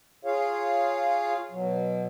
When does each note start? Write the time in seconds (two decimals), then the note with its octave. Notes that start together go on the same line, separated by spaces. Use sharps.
0.25 F4 G#4 C#5 F5
1.51 B2 F#3